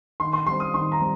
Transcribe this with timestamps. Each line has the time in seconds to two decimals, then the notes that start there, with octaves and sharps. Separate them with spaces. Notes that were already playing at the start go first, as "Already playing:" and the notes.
0.20 D#3 C6
0.33 C6
0.46 G3 C4 C6
0.60 D#6
0.74 D#3 C6
0.92 A#5
1.00 G3 C4